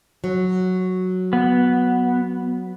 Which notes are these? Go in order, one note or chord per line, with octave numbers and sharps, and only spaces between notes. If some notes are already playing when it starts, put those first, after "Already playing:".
F#3
B3